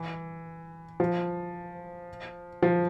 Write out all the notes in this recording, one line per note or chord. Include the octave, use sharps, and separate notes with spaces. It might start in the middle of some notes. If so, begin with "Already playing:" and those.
Already playing: E3
F3
F3